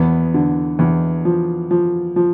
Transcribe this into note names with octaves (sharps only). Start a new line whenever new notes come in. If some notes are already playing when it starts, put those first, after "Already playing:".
Already playing: E2 B3
D3
E2
F3
F3
F3